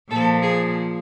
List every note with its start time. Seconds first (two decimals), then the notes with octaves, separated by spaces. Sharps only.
0.10 A#2 F3 A4
0.42 G#4